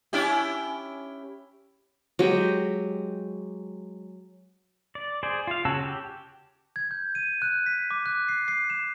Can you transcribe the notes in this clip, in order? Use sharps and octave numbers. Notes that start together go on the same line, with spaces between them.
C#4 E4 G4
F#3 G#3 G4 D#5
D5
G#4 C5 D5
F4 F5
C#3 F#4 C#5 A5 E6
G4
G#6
G6
D#7
F#6
B6
D6
F#6
C7
C7
E7